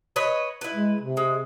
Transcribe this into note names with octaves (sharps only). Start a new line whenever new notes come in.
B4 C#5 D#5
E4 B4
G#3
C3
G#3